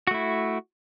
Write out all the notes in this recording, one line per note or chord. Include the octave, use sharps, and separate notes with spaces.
A3 E4 F#4